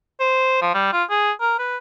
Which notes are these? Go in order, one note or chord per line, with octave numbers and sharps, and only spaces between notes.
C5
F3
G3
F4
G#4
A#4
B4